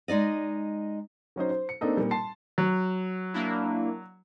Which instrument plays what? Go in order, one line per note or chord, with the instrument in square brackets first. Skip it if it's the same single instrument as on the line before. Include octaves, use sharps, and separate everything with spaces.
[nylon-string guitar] G#3 D#4 D5 D#5
[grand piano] F#3 C#4 D#4 C5
C5
C#7
A#3 C4 D4 D#4 A4
A#2 G3
A5 C6 C7
[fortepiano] F#3
[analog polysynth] A#3 D4 E4